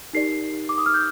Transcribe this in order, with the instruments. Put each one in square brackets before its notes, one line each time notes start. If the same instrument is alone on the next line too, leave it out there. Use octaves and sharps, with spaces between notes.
[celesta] D#4 G4 A#4 D5 C7
D6
D#6
F6
G6